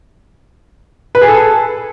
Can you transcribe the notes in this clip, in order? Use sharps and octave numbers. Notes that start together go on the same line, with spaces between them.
B4
G#4
A4